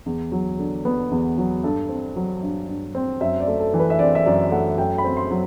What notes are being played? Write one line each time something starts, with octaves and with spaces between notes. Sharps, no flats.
E2
F#3
D3
B3
E2
F#3
G2 A4
C4
F#3
G2
G2
C4
F#2 E5
D5
A3
A4
E3
B4
E5
C4 D5
E5
F#2 D5
A3 F#5
F#2 G5
B5
C4
C6
F#3